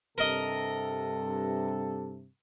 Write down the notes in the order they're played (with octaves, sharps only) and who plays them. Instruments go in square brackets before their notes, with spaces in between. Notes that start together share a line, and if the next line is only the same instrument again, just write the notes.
[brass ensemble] G2 C3 [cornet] A4 [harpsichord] A#4 D#5